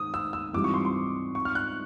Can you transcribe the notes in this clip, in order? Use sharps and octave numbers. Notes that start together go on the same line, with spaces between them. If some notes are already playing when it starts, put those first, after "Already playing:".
Already playing: G#2 D#3 D#6
E6
E6
G#2 E3 G3 C4 F4 D6
C#6
C6
C6
C#6
F6
F#6